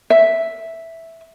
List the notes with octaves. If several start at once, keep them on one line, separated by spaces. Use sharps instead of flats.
E5